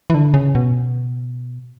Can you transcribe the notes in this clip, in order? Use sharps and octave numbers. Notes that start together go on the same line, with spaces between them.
E3
D3
C#3
B2